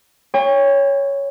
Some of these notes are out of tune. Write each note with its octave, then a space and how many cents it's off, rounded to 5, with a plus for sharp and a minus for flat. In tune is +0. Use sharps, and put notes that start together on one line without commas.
C#5 +5 G5 +45 C6 -45